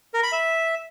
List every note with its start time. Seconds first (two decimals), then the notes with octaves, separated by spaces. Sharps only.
0.14 A#4
0.23 B5
0.32 E5